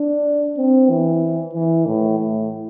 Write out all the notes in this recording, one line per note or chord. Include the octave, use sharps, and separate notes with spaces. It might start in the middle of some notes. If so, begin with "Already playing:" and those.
Already playing: D4
C4
E3
E3
A2
A2